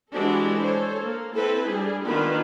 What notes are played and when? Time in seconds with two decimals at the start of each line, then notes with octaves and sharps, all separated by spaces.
0.12 E3 G#3 D4 F#4 G4 A4
0.62 A4 C5 C#5
1.02 A#3
1.36 C4 E4 A4 B4
1.68 G3 D4 G#4
2.05 D#3 A#3 B3 D4 F4 B4